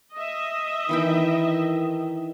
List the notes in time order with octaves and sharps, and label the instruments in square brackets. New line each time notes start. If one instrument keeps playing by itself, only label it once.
[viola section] D#5 E5
[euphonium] D#3 [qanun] E3 E4 G5